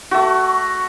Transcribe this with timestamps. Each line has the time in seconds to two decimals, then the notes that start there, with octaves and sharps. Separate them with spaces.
0.11 A3 F#4